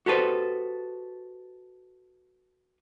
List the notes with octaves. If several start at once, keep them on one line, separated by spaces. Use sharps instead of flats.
F#4 G4 A4 B4 C5